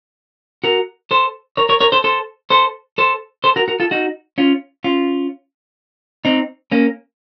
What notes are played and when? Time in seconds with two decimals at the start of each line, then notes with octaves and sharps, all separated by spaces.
0.64 F#4 A#4
1.11 A4 C5
1.57 A#4 C#5
1.69 A#4 C#5
1.80 A#4 C#5
1.92 A4 C5
2.04 A4 C5
2.50 A4 C5
2.98 A4 C5
3.44 A4 C5
3.56 F#4 A#4
3.68 F#4 A#4
3.80 F4 A4
3.91 D#4 F#4
4.38 C#4 F4
4.84 C#4 F4
6.25 C4 D#4
6.72 A#3 C#4